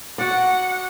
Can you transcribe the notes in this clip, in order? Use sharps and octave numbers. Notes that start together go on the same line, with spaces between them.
F#4 D5 F#5